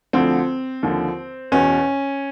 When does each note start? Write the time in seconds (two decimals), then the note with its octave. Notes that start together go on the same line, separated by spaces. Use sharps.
0.13 D2 D3 F3 C4
0.83 D#2 D3 F3
1.52 E2 B2 C#4